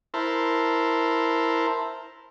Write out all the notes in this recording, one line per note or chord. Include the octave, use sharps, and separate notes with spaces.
E4 A#4 C5 A5